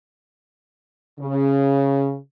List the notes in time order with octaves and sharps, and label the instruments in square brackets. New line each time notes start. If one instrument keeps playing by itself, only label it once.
[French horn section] C#3